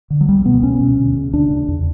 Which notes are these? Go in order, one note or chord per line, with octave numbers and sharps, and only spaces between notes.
D3
F#3
C#2 G3
B2 B3
C#2 C#4
B2
D2
C#3
D2 D4
C#3
E2